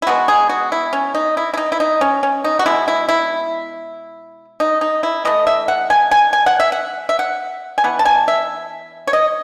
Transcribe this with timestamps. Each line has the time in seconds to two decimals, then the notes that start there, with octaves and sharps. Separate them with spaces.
0.02 E4
0.07 B2 G#3 B3 F#4
0.28 G#4
0.49 F#4
0.72 E4
0.93 C#4
1.15 D#4
1.37 E4
1.54 E4
1.57 D#4
1.72 E4
1.80 D#4
2.01 C#4
2.23 C#4
2.44 D#4
2.59 F#4
2.66 B2 G#3 B3 E4
2.88 E4
3.09 E4
4.60 D#4
4.81 D#4
5.03 E4
5.25 E3 A3 D#5
5.47 E5
5.68 F#5
5.90 G#5
6.11 G#5
6.33 G#5
6.46 F#5
6.60 E5
6.72 F#5
7.09 E5
7.19 F#5
7.78 G#5
7.84 E3 B3 F#5
7.99 A5
8.05 G#5
8.28 E5
9.07 C#5
9.13 D#5